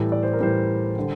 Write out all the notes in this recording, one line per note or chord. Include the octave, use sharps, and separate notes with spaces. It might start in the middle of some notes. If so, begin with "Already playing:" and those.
Already playing: A2 E3 G3 A4
D5
C5
A#4
A2 E3 G3 C5
D3 G3